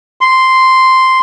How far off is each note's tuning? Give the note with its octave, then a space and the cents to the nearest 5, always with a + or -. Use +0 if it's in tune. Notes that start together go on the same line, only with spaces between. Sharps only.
C6 -5